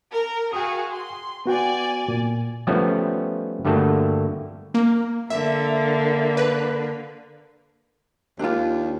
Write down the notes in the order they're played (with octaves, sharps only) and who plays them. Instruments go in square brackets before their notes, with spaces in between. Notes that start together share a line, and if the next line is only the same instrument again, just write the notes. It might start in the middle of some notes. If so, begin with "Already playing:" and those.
[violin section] A#4
[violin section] F#4 G#4 F5 [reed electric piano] G5 D#6
[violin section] C6
[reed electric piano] B3 F#4 G5 [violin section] D5 G#5
[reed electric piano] A#2
[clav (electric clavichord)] F3 G3 A3 B3 C#4
G2 D3 G3 A3 A#3 F#4
[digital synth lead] A#3
[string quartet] D3 A#3 [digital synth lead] E5
[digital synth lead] B4
[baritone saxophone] D#2 [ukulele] D4 F4